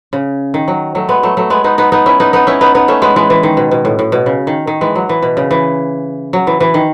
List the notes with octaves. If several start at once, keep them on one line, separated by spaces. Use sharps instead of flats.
C#3
D#3
F#3
F#3 A3
G#3 B3
F#3 A3
F#3 A3
G#3 B3
B3 D#4
B3 D#4
B3 D#4
C#4 E4
B3 D#4
B3 D#4
C#4 E4
B3 D#4
B3 D#4
A3 C#4
G#3 B3
E3 G#3
E3
D#3
B2
B2
A2
A2
B2
C#3
D#3
D#3
E3 G#3
F#3
E3
B2
C#3
E3
F#3
E3
E3
D#3